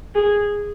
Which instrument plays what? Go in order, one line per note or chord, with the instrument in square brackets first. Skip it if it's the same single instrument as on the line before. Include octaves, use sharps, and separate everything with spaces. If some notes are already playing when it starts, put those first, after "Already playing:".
[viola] G#4